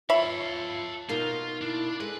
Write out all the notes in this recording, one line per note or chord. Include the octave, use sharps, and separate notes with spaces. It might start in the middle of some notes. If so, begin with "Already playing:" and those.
F4 A4 C#5 E5 F5 B5
B2 A#3 D#4 F4 A#4
D4 E4
G#3 A4 B4